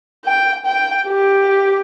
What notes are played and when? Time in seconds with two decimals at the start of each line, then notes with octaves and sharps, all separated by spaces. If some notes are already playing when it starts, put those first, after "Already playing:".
0.25 G5
0.66 G5
1.07 G4